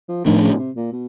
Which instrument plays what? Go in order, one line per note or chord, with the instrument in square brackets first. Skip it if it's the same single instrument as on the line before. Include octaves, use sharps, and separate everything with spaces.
[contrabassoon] F3
[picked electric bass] A2 F3 A3 D4 [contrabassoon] D#3
[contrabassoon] C#3
B2
C3
A#2
B2